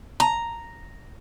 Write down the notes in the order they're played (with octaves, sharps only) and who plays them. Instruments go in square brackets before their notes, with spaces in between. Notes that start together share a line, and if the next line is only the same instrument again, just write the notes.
[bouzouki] A#5